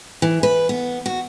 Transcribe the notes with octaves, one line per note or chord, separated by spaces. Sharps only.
E3
B4
B3
F#4